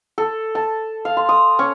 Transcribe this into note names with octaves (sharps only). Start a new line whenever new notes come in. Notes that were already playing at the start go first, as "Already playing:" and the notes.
A4
A5
F5
C6
D#6
C#4